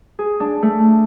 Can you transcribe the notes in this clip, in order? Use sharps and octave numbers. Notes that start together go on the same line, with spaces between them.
G#4
D4
A3